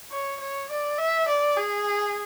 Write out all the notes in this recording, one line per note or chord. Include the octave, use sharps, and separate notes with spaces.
C#5
C#5
D5
E5
D5
G#4